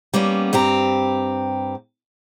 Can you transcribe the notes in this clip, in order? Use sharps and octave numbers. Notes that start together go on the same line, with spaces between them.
G3 A#3 B3 C#4
G2 C4 G4 A#5